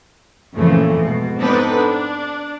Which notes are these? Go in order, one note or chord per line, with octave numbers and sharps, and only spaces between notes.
F2 A#2 C#3 E3 F3 A3
G#2 B2
B3 C4 D4 D#4 A4 B4
D4